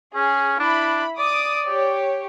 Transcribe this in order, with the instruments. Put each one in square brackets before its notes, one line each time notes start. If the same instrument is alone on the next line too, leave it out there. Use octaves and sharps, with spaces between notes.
[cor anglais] C#4 [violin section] G#4
[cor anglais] D4 [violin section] E4 B5
[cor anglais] D5 [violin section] D6 D#6
[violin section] G4 C#5